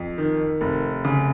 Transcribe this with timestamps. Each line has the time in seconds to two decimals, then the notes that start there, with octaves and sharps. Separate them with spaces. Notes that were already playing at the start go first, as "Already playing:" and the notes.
Already playing: F2
0.18 D#3
0.61 F1
1.05 C#3